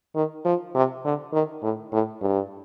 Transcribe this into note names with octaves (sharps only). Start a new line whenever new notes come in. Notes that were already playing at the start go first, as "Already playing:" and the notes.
D#3
F3
C3
D3
D#3
A2
A2
G2